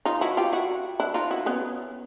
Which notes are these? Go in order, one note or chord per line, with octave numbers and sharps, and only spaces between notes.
D#4 F4
E4 F#4
F4 G4
E4 F#4
D4 E4
D#4 F4
E4 F#4
B3 C#4